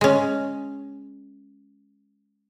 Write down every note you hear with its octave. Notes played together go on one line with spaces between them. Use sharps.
G#3 C#4